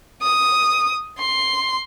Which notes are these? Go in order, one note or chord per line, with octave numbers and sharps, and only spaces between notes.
D#6
C6